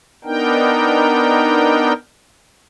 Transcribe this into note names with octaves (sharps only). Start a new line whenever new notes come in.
B3 D4 D#4 A#4 G5